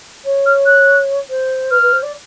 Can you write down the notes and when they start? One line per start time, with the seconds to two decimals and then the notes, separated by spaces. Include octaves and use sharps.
0.25 C#5
0.46 F6
0.66 F#6
1.30 C5
1.71 B4 F6
1.82 B4
1.92 C5
2.03 D5